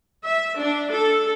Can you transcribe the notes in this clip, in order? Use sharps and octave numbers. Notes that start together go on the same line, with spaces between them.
E5
D4
A4